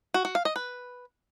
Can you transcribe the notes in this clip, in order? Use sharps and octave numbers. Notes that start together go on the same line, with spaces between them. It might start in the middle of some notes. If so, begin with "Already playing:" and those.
F#4
F#4
F5
D#5
B4